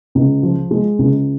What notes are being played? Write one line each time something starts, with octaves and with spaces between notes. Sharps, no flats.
C#2
F3
G#3
C#2